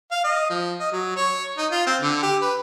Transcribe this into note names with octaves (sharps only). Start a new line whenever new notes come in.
F5
D#5
F3
D#5
F#3
C#5
D#4
F4
C4
D3
G4
B4